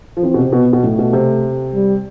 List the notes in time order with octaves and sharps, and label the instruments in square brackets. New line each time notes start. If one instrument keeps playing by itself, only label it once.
[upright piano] F3
[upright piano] E3 [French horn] C4
[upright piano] B2
C3
[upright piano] B2 [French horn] B3
[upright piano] B2
[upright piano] A2 [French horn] A3
[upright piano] B2
C3
[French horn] G3